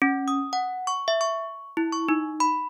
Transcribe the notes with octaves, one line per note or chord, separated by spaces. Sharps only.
C#4
D#6
F#5
C#6
E5
C#6
E4
C#6
D#4
B5